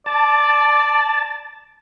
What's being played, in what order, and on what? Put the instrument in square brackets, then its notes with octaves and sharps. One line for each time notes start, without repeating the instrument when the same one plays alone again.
[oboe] D5 [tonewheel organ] A5